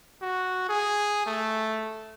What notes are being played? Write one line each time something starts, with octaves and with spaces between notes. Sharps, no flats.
F#4
G#4
A3